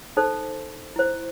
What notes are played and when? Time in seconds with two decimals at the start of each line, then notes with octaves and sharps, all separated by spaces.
0.17 D#4 A4 C5
0.96 E4 C5